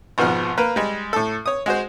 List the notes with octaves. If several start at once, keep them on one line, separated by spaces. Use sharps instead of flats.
G#1 F2 B2 F3 F#5 F6
A#3 A#4 B4
G3 G#3
A2 A4
C#5 D#6
G#3 F#4 C5